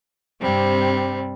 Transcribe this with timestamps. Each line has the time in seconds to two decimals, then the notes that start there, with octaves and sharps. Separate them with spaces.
0.41 G2 C3 G3 C4